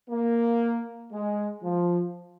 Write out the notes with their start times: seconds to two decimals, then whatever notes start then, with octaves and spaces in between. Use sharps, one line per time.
0.10 A#3
1.12 G#3
1.63 F3